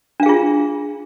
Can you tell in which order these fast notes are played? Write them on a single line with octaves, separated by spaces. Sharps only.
D4 F5 G#4 F4